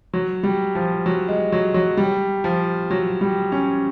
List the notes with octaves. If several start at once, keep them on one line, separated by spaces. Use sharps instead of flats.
F#3
G3
F3
F#3
G#3
F#3
F#3
G3
F3
F#3
G3
C#4